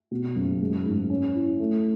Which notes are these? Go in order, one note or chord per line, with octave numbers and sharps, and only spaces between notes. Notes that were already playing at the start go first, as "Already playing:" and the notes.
B2
F#1
G#3
G#2
C#4
E4
A3